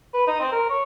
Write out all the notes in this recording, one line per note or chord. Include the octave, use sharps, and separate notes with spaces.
B4
D#4
C4
A#4
C#5